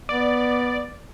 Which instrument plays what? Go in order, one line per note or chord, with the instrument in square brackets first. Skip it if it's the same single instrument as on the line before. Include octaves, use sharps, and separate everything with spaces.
[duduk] B3 [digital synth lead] D5